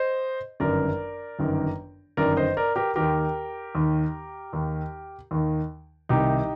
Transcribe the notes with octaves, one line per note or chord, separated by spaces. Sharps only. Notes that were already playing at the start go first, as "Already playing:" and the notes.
Already playing: C5 D#5
G1 F#2 D#3 A#4 D5
G1 F#2 D#3
G1 F#2 D#3 A#4 D5
C5 D#5
A#4 D5
G4 A#4
D#2 D#3 G4 A#4
D#2 D#3
D#2 D#3
D#2 D#3
C2 C3 D#3 D#4 G4